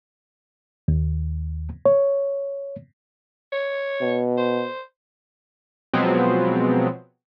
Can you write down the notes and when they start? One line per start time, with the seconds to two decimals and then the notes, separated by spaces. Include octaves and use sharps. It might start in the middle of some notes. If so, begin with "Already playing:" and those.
0.88 D#2
1.85 C#5
3.52 C#5
4.02 B2
4.37 C5
5.93 B2 F3 F#3 G#3 B3 C4